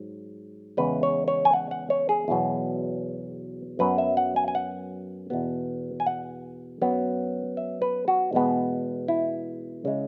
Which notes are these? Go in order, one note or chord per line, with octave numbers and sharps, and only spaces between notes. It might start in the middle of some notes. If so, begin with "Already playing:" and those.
Already playing: G#2 F#3
E2 C#3 E3 G#3 B4
C#5
C#5
G#5
F#5
F#5
C#5
G#4
E2 B2 F#3 B3
F#2 F#3 B3 B4
E5
F#5
G#5
G#5
F#5
E2 B2 B3
G#5
F#5
F#2 F#3 B3
E5
B4
F#4
E2 B2 G#3 B3
E4
C#3 G#3